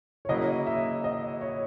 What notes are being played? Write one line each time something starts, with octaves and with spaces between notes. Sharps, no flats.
C#5
C#3 F#3 A#3 E4 D#5
E5
D#5
C#5